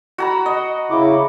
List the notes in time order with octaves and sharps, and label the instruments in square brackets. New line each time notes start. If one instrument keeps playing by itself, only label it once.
[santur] F#4 A#5 B5
D#5
[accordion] C#3 E4 D6